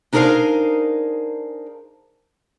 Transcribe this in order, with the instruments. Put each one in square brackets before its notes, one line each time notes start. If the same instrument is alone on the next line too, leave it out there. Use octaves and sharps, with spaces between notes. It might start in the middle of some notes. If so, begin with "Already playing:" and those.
[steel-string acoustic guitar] D4 D#4 G#4 A#4 C5 F5